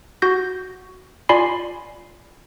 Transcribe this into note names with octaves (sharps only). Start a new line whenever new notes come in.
F#4 G6 A#6
F4 D5 G#5 B5 C6 C7